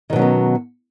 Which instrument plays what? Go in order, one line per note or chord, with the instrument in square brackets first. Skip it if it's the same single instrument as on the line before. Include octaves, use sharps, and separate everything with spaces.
[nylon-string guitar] D#3
B2
F#3
C#4
B3